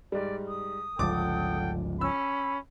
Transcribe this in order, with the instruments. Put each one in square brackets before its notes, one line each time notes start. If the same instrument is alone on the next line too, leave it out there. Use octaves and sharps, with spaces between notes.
[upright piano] G#2 G3 [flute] D5
[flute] D#6
[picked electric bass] G1 C#2 F3 [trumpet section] A4 F#5 G5 [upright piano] D6 A6
[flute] C#4 [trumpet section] B5 [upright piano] E6